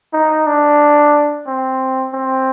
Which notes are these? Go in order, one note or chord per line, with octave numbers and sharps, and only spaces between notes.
D#4
D4
C4
C4